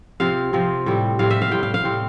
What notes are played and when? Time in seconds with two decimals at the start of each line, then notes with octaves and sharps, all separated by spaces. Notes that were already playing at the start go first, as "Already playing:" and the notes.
0.20 C3 F3 C4 F5
0.53 C3 F3 C4
0.86 A2 G3 C4
1.19 A2 G3 C4 F5
1.30 E5
1.42 F5
1.52 A2 G3 C4 G5
1.63 F5
1.74 F5
1.85 A2 G3 C4